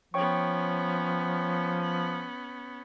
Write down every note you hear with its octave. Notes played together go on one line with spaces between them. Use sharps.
F3 B3 C#4 C#5 G5 C#6